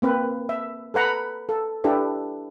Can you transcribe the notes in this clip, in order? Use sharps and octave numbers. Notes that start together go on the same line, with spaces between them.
A#3 C4 B4
E5
A4 B4 F#5 A#5 B5
A4
D4 E4 G4 A4 B4